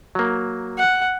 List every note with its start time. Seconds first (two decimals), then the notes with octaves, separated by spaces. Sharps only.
0.15 F#3 A#3
0.78 F#5